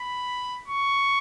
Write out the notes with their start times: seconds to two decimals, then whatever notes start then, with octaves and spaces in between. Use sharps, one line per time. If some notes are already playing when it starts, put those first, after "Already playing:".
Already playing: B5
0.68 C#6